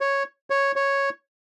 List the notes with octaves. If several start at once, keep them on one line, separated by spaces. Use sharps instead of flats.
C#5
C#5
C#5